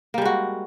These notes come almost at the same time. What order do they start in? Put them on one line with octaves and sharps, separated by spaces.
A#3 G3 G#3 F#4